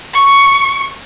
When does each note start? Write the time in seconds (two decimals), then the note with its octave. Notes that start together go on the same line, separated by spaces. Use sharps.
0.13 C#6